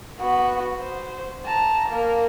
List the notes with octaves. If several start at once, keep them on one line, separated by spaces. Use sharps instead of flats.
B3 F#4
C5
A5 A#5
A#3 A#4